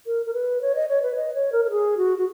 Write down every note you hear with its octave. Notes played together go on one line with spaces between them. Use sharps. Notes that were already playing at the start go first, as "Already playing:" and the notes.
A#4
A#4
B4
C#5
D#5
C#5
B4
D#5
C#5
A#4
A#4
G#4
F#4
F#4